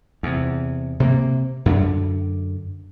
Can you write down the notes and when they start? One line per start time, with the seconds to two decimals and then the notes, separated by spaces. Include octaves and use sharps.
0.23 E2 C3
1.00 C3 A#3
1.66 F#2 D3 G#3 D4